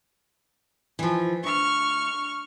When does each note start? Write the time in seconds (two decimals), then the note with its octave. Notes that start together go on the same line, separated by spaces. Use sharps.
0.99 E3 F3
1.44 D2 C#6 F6